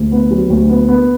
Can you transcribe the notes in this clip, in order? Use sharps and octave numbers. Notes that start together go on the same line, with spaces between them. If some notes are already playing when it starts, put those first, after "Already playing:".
Already playing: D2
B3
F#3
D2
B3
B3